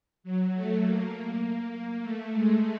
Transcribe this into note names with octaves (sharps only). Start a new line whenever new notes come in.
F#3
A3
A#3
A#3
A3
G#3